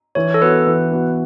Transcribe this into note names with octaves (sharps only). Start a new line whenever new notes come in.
E3 C#5
A4
B3 F#4 B4
E3
B3 F#4